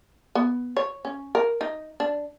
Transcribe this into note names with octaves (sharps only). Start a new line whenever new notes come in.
B3
C#5
C#4
A#4
D#4
D4